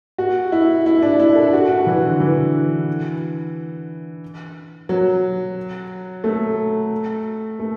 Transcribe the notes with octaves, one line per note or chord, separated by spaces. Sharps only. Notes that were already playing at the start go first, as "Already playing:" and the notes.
F#4
E4
E4
D4
E4
A4
F#4
F#4
E3
D3
E3
F#3
A3
A3